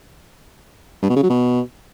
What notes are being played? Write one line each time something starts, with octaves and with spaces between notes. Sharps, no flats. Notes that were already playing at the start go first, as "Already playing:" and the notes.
G2
B2
C#3
F#3
B2